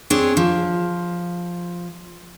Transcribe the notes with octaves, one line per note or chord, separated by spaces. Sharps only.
C4 D4 G#4 C#5
F3